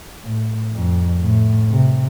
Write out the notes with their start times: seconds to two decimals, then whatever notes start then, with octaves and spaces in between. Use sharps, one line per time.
0.23 A2
0.72 F2
1.22 A2
1.71 C3